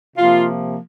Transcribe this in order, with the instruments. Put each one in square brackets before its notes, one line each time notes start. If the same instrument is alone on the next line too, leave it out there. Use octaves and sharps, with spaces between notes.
[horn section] C3 F3 A#3 F4